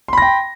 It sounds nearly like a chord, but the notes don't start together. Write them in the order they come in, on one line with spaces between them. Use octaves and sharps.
C6 B5 A#6 G5